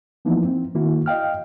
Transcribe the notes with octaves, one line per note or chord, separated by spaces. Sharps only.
E3 F3 A#3 B3 D#4 E4
C4
D#3 A#3 E4 F#4
D#5 F5 G5 F6